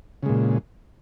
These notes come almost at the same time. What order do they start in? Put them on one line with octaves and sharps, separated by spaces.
C#3 G#3 A#2